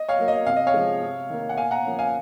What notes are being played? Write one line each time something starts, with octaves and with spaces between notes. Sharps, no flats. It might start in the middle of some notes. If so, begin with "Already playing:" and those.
Already playing: D#5
C#5 F5
F#3 A#3
D#5
C3 F5
D#5
C#5 F5
F3 G#3
C3
D#3 A#3
F#5
A#2 F5 G#5
F#5 A#5
F3 A#3 C#4
F5 G#5